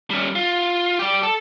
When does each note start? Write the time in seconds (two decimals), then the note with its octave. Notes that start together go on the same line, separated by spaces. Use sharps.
0.11 G3 C#4
0.35 F4
0.99 G4 D5
1.23 A4